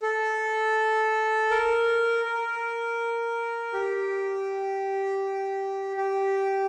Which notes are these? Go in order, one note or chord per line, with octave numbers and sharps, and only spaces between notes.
A4
A#4
A#4
G4
G4